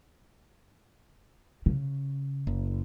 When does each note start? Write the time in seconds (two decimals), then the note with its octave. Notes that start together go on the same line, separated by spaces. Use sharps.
1.66 C#3
2.47 F#1